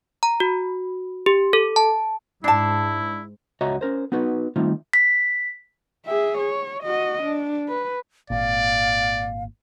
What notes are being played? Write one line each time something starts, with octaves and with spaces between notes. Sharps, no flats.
A#5
F#4
G4
A4
A5
G#2 D4 E4 A5
C#2 F#4 C#5 D#5 E5 A#5
C#4 A#4 C5
B3 D#4 F#4 B4
D#3 G3 A3 C4 D#4 F4
B6
G#4 E5
C#5
F#4 D#5
D4
B4
G#1 A#2 D5 F5